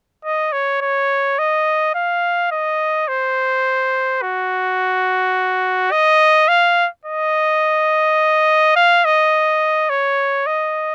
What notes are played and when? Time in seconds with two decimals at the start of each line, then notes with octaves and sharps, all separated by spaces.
0.25 D#5
0.52 C#5
0.81 C#5
1.39 D#5
1.95 F5
2.51 D#5
3.08 C5
4.22 F#4
5.91 D#5
6.48 F5
7.05 D#5
8.76 F5
9.05 D#5
9.90 C#5
10.46 D#5